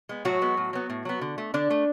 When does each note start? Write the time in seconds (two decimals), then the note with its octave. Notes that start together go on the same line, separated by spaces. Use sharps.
0.09 G#3 B3
0.25 A2 F#3 F#4
0.42 G#3 B3
0.57 A2
0.73 F#3 B3
0.90 A2
1.05 F#3 B3
1.21 D3
1.38 A3
1.54 D3 D4
1.70 A3